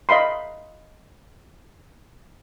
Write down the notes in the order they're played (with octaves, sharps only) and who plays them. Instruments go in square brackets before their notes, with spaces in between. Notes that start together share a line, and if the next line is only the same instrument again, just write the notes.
[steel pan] D#5 F5 B5 C6